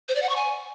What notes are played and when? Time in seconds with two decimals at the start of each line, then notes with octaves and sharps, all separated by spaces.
0.09 C5
0.16 D5
0.22 F#5
0.29 C#6
0.36 G#5